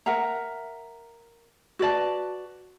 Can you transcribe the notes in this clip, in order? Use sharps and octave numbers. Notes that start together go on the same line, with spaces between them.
A#4 E5 F#5 A#5
F#4 B4 D5 A5